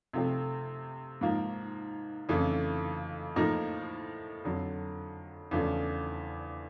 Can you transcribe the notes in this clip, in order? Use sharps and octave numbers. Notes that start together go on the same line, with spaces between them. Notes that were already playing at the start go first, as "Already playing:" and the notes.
C3 F3 A3 C4
G#2 F3 A#3
F2 C#3 E3 A3
A2 F3 A#3 D#4
F2 D3 F#3
E2 C#3 F3 A3 D4